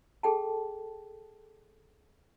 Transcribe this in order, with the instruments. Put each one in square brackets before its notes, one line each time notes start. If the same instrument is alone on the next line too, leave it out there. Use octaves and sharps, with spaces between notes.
[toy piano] G#4 A4 G5 A5